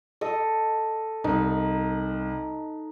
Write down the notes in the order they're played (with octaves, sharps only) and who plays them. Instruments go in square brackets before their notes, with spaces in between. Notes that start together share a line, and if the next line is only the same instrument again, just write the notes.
[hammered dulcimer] A4 D#5
[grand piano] C2 [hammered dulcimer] D#4